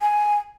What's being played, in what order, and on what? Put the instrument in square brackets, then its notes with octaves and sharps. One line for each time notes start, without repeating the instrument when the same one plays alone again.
[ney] G#5